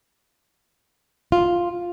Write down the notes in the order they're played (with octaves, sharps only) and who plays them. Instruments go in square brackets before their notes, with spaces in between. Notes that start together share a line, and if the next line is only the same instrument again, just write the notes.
[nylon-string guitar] F4